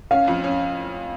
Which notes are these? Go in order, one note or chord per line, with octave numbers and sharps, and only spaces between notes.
C#4 F5
F2
C#4